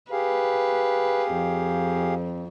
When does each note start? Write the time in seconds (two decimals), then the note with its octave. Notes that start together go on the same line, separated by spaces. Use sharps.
0.12 G4 G#4 B4 F5
1.33 F2